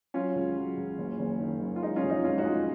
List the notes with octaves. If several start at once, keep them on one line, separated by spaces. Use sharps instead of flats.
F#3 C#4 F4
C#2
F#3
C#2
F#1
F#1
D#3
F#2
F4
G#3 D#4
C#4 F4
F1
D#4
G#3 C#4 F4
D#4 F#4
G#3